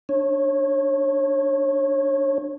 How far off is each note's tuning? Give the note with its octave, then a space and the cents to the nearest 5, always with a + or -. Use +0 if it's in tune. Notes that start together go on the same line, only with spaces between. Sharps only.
D4 +10 C#5 -25